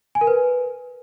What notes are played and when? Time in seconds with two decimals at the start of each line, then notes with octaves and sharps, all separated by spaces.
0.15 G#5
0.21 A#4
0.27 B4